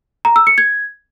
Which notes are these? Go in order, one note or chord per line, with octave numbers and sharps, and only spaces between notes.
A#5
E6
C#7
G#6